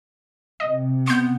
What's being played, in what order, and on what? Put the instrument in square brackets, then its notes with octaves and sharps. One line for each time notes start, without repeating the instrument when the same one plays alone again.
[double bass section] C3 [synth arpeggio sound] D#5
[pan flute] B3 [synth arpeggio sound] C6 G6